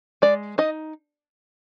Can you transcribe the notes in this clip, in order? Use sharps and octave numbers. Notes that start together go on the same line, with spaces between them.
G#3 D5
D#4 D#5